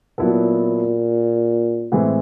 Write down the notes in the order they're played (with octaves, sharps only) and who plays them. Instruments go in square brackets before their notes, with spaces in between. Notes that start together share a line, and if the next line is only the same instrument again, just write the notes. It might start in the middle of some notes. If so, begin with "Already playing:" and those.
[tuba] A#2 [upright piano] F#3 B3 E4 A4
[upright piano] A2 E3 G#3 C4